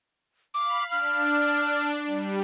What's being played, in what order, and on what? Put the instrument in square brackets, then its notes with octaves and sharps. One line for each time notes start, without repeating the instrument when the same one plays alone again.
[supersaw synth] F5 B5 [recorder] D6
[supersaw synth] D4 [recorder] F6
[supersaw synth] G3